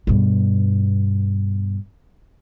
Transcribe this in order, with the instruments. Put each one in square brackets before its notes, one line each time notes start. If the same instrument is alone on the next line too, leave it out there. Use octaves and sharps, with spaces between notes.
[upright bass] G2 B2